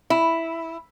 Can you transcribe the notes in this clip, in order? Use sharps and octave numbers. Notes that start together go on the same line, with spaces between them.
E4